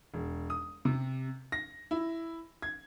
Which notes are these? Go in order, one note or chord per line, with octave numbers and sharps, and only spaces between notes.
E1
D#6
C3
A#6
E4
G#6